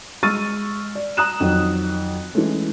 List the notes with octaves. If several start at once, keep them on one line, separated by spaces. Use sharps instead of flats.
G#3 C#6 E6 F6 A6 D#7
D5
A#5 D#6 F#6 E7
F2 D#3 F#3
E3 G#3 A3 C#4